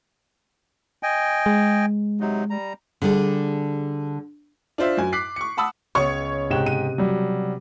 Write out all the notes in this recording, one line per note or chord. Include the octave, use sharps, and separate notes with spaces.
D#5 G5 G#5
G#3
C3 F#3 D#4
G3 A#5
D3 G3 G#4 A4
D4 F4 C5 E5
F#2 G#5
D6 F#6 B6 C7
C#6 C#7
F#5 A5 B5 D#6 E6
C#2 B3 C#5 C#6 D#6
G#2 C3 G4 G5 F#6 E7
D#7
F#3 G3